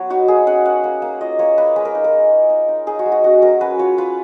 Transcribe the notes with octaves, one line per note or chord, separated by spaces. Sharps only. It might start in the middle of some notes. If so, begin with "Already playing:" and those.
Already playing: F#3 B3 B4 C#5
D#4 F#4
A#3 G#4
C#4 F#5
A#3 F#5
A#3
A#3
F4 D#5
A#3 C#5
A#3 B4
G#3 B4
A#4
D#4
A#4
G#3
G#3
D#4
D#4
D#4 G#4
F#4
G#3
F#4
C#4 F#4
F#3 A#4
C#4 B4
F4 C#5
F4 B4